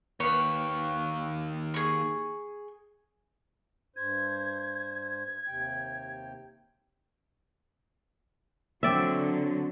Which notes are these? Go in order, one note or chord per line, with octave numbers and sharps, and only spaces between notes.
D#2 B4 C#5
G#4 C#6
G2 C5 G#6
D#2 C3 G5
D3 F#3 C4 D5 E5